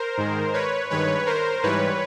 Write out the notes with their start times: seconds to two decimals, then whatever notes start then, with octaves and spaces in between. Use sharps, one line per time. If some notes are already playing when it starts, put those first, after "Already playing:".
Already playing: A#4 C5
0.17 G#2 D#3 G#3
0.53 B4 C#5
0.90 G2 D#3 G#3 B4 C#5
1.27 A#4 C5
1.63 G#2 E3 G3 B4 C#5